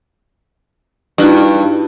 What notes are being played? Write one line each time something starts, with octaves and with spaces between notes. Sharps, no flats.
G2 D#4 E4 F#4